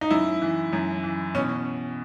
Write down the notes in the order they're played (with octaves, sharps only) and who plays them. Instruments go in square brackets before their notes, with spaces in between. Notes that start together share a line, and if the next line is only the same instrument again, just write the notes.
[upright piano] D#4
F#2 E4
E3
F#2
E3
B2 C#4